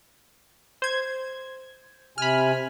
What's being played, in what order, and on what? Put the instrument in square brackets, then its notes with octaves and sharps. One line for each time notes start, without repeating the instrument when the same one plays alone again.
[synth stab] C5 G#6
[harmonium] C3 G#5 [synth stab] B5 F6